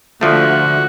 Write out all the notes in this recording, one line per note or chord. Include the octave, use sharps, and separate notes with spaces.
D2 D3 F3 A3 F#4